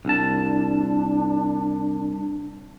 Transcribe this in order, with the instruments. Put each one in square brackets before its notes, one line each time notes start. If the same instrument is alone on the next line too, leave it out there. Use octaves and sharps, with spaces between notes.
[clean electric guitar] C2 A5 [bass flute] D4